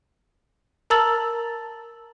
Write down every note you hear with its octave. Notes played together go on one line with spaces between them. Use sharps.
A#4 A5 A#5 E6 A6 F#7